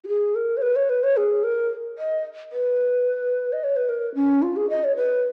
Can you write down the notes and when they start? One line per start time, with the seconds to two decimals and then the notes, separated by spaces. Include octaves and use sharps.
0.04 F#4
0.08 G#4
0.35 A#4
0.57 C#5
0.62 B4
0.76 C#5
0.90 B4
1.03 C#5
1.17 G#4
1.44 A#4
1.98 D#5
2.52 B4
3.53 D#5
3.64 C#5
3.76 B4
3.89 A#4
4.15 C#4
4.42 F4
4.56 G#4
4.70 D#5
4.84 C#5
4.96 B4